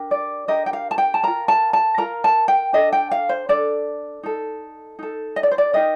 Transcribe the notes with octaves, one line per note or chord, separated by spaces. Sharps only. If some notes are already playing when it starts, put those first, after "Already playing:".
Already playing: D4 G4 A#4
D5
D4 G4 A#4 D#5
G5
F5
A5
G5
A5
F4 A#4 A#5
A5
A5
F4 A#4 A#5
A5
G5
D4 A4 D#5
G5
F5
C5
D4 A4 D5
D#4 A4
D#4 A4
D#5
D5
C5
D5
D#4 G4 A#4 D#5